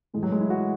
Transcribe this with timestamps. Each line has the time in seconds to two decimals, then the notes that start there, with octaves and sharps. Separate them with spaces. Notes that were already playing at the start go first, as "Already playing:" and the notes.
0.14 A2 G#3
0.17 E3
0.23 F#3
0.32 G#3
0.41 E4
0.50 F#4